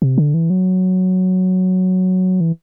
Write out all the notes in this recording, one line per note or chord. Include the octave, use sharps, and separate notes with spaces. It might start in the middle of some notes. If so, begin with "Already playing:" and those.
C3
D3
E3
F#3
E3